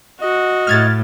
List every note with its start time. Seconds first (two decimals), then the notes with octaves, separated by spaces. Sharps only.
0.21 F#4 D#5
0.67 A2 F6 G#6 A6